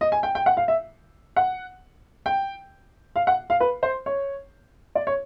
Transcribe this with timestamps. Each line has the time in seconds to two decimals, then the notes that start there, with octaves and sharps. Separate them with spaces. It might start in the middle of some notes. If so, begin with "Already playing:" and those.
0.01 D#5
0.12 G#5
0.23 G5
0.35 G5
0.46 F#5
0.57 F5
0.68 E5
1.36 F#5
2.26 G5
3.16 F5
3.27 F#5
3.50 F5
3.60 B4
3.83 C5
4.06 C#5
4.95 D5
5.07 C#5